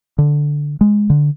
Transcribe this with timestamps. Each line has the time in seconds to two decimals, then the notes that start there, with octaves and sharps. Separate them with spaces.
0.18 D3
0.81 G#3
1.10 D3